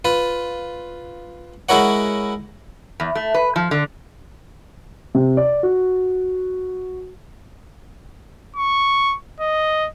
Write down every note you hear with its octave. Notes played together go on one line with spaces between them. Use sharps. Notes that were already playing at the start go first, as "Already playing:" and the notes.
F4 B4
G#3 E4 F#4 A#4 C#5 F#5
E2
A3
B4
F3
D3
C3
D5
F#4
C#6
D#5